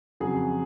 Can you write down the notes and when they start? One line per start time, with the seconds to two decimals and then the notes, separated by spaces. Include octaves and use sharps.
0.20 F2 C#3 F#3 G#4